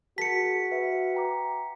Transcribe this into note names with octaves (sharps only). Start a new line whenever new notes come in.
F#4 G#4 A#4 A5 B6 C#7
B4 E5
G5 A#5 D6